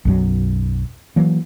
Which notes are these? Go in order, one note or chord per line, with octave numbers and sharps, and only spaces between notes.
B1 F#2 F#3
E3 F#3 A#3